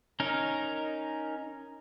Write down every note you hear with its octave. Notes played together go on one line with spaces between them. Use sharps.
C#4 D#4 A#4